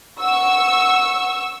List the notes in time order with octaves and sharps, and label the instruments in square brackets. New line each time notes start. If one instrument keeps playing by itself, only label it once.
[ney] F#5 [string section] C#6 E6